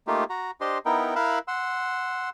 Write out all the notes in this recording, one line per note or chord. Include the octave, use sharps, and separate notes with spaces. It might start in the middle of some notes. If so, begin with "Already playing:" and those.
A3 A#3 D#4 F4 G4
F#4 A#5
D4 G4 C5 D#5 C6
B3 D#4 E4 A#4 G5
E4 A#4 F5 B5 E6 F#6
F#5 C6 E6